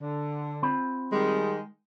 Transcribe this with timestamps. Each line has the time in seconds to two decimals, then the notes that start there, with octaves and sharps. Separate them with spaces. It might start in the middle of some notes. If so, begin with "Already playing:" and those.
0.01 D3
0.62 C4 F4 B5
1.12 D#3 G3 G#3